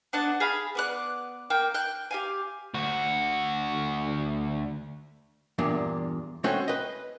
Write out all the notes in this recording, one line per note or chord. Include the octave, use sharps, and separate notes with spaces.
B3 D4 F#5 A5
G#4 F5 B5
B3 D5 F#6
A#3 G5
G5 F#6
G4 F5 G#5
D2 F#4
E2 G2 A#2 D4
G#3 A3 C4 C#4 F#4
B4 D#5